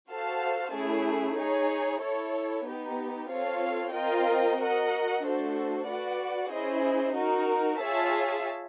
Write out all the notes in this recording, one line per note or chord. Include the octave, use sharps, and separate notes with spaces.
F#4 A4 C5 F5 A5
A3 C#4 E4 G#4
D#4 G#4 C#5
E4 A4 C#5
B3 D#4 G4
C4 F4 A4 C#5 F5
C4 F4 A#4 D#5 G5
F#4 A#4 D#5 F#5
A3 D4 F#4 A4 C5
F#4 B4 D5 F#5
C#4 E4 G#4 C5 D#5
D#4 F#4 A#4
F4 G#4 C#5 E5 A5